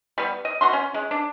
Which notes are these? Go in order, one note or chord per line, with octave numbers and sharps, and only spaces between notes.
G3 B3
D#5
B2 F#4 C6
C#4
G#3
D4